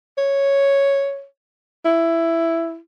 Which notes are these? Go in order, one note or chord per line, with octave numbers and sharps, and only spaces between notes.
C#5
E4